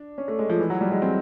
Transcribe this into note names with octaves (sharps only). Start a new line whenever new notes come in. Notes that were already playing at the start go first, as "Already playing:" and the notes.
Already playing: D4
C#4
A3
G#3
F3
E3
F#3
G3
G#3
C4